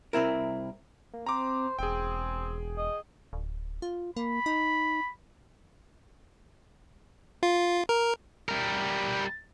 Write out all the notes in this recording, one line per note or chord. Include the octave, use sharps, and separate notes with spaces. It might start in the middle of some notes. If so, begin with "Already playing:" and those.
C2 C4 E4 A#4
A#3
C4 C5 A#5 D6
E1 C4 G#4 G5
D#5
D1
F4
A#3 B5
D#4
F4
A#4
G3 A#4